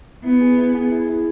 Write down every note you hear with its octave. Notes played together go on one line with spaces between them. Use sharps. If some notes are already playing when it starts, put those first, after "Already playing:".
B3 E4
G#4
E4
G#4
E4
E4